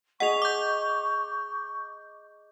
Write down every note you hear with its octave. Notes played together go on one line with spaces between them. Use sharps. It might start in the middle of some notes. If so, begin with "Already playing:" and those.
G#4 D#5 F#5 C#6 F7
D6 G6